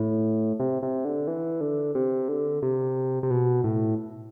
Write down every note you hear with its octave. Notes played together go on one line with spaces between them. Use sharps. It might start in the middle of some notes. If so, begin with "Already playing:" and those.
Already playing: A2
C3
C3
D3
E3
D3
C3
D3
C3
C3
B2
A2